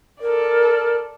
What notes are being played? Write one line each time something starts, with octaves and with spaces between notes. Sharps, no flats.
A4 A#4 D5